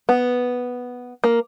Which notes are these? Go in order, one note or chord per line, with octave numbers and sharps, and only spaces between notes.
B3
A#3